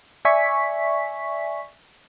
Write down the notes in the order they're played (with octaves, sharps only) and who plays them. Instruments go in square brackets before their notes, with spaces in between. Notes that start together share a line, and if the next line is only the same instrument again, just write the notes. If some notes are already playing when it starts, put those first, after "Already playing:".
[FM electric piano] D5 E5 G#5 C#6 B6